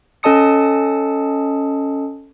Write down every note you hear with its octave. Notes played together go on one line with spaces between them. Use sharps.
C#4 A4 D#5 A5 D#6 C#7